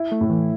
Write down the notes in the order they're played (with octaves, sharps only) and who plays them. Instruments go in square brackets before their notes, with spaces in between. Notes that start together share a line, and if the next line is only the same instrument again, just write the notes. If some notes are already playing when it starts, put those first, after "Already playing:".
Already playing: [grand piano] E4
[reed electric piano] A3
[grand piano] A2
[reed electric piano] E3